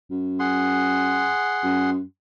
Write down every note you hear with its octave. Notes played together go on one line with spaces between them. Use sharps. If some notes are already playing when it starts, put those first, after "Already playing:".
F#2
G#4 F#5 C6
F#2